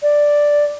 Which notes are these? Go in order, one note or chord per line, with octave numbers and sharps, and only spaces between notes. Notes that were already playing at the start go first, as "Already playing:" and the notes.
D5